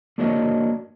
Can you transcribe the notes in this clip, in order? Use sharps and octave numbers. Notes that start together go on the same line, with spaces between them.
A#3 D4 F#4 A#4 C#5 D#5